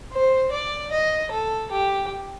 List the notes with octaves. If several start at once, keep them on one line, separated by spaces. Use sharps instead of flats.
C5
D5
D#5
A4
G4